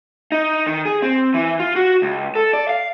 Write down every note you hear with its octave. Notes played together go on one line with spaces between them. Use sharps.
D#4
D#3
G#4
C4
E3
F4
F#4
C#2
A4
D5
F5